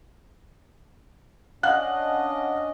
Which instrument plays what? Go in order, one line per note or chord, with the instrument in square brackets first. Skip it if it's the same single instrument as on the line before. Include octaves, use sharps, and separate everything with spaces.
[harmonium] C#4 D4 D#5 [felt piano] F5 F#5 F#6